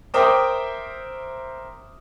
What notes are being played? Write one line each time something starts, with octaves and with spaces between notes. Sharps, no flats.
A#4 C5 E5 G5 D6 D#6